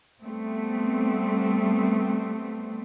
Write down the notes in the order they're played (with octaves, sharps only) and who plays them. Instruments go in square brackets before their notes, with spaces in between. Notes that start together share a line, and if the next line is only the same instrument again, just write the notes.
[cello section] G3 A3 B3 C4